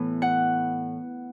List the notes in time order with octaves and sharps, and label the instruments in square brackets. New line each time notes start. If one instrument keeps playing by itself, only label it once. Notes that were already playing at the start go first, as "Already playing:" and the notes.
Already playing: [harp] A2 E3 B3
F#5